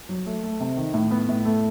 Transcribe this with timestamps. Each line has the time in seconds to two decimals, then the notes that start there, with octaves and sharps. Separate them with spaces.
0.09 F#3
0.26 A3
0.43 A3
0.60 C3
0.77 D#3
0.94 A2
1.11 B3
1.29 A2
1.45 A3